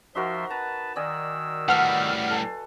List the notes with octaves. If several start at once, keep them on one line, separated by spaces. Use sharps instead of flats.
F3 D#4 F#4 A#4 E5 C6
B4 A5 A#5
D#3 D5 D#5 G#5 E6
A2 G3 B4 F#5 A5 F6
A4 G#5